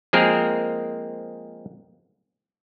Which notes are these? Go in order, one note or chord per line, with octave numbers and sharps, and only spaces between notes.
F3 G#3 A#3 C4 G#4 A#4